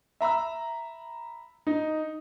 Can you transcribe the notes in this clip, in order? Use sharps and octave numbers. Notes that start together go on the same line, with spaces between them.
E5 A#5 B5 E6
D#4